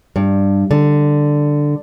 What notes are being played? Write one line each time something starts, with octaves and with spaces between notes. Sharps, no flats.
G2
D3